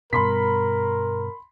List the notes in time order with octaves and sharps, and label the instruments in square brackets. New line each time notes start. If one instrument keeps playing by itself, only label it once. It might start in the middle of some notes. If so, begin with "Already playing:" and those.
[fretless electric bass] G2 B2 [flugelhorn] A#4 [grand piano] B5 C6 B6